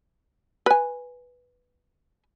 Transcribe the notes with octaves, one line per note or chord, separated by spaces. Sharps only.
B4 G#5